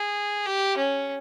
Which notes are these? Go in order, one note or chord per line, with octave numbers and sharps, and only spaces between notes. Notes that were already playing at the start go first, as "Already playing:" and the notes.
Already playing: G#4
G4
C#4